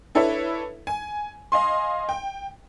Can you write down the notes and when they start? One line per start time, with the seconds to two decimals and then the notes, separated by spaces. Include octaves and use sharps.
0.15 D4 E4 A4 B4 C#5 E5
0.87 G#5
1.52 D#5 F5 G#5 C6
2.09 G5